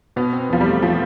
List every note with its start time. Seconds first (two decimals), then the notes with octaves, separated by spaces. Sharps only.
0.16 B2 B3
0.33 C4
0.49 E2 F3
0.61 G3
0.66 A3
0.82 B2 F3